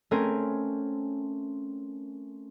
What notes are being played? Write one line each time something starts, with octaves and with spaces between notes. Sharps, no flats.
A3 C4 C#4 A#4 C5 G#5